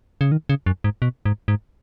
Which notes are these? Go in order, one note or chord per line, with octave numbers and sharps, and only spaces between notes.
C#3
D#3
C#3
F#2
G#2
B2
G#2
G#2